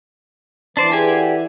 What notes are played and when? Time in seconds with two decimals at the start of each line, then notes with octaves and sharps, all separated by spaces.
0.77 E3 D4 C5 D5 A5
0.92 G4 G#4 B4 D5 G#5
1.07 A4 D5 F#5